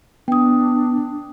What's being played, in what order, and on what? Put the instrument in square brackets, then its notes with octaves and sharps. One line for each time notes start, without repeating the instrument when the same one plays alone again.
[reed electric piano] B3 [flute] D4 [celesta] G5 D#6